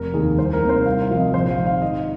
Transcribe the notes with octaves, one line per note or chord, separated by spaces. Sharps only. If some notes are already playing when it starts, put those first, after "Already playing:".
Already playing: F1 A#4
D#2 D#3 A#3 G#4
C2 C5
A#4
C3 D#3 A#3
C5
C2 F5
F5
C3 F3 C4
D#5
A#1 C5
F5
G#2 D#3 C4
F5
G#2 D#5